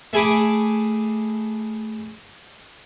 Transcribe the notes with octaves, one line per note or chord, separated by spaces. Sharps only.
A3 G#4 G#5 B5 D6